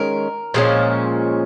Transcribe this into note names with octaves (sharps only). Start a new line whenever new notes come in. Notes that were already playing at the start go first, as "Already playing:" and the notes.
Already playing: D#3 G#3 C#4 A#4
A#2 F3 G#3 C#4